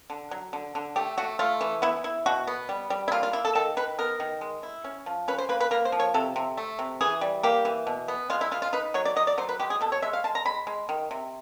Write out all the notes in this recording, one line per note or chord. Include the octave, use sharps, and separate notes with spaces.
D3
F#3
D3
D3
A3 G4
A3 F#4
A3 F4
E3
B3 E4
E4
B2 F#4
B3
G3
G3
E4
A#3 F4
F4
A#3 E4
A4
D#3 A4
D#3 B4
B3 A#4
D#3
G#3
E4
C#4
F3
C#4 B4
C5
A#3 B4
B4
A#3 A#4
C5
F3
C#5
C3 A4
C3
A3
C3
E3 G#4
G3
A#3 G4
E3
B2
B3
G#3 F4
E4
G#3 F4
F4
D#4 B4
F#3 C#5
D5
F#3 D#5
D5
F#3 C5
B4
G#3 G4
G#4
B2 A4
C#5
G#3 E5
F5
G#3 A5
A#5
G#3 B5
G#3
D#3
C3